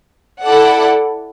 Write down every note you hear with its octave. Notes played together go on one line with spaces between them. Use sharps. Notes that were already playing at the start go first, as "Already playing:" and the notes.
E4 A4 D5 F#5